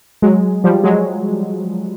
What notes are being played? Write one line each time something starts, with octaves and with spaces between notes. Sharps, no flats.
F#3 G#3
F3 G3
F#3 G#3